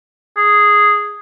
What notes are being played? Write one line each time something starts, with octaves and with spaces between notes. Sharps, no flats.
G#4